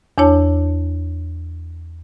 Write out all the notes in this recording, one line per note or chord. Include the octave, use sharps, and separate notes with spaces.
E2 D4 E4 C#5 A5